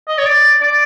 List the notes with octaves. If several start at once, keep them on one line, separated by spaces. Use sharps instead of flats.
D#5
C#5
D5
D5